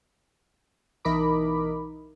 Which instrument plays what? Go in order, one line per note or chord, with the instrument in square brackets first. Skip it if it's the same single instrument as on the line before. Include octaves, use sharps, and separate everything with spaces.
[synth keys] B1 E3 D#4 A#4 B5 D6